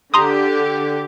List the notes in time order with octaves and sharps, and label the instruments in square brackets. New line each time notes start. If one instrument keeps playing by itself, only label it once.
[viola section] D3 G4 [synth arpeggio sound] A#5 C6 D#6